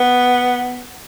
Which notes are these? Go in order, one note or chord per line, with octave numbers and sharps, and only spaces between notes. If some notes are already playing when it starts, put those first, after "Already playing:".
Already playing: B3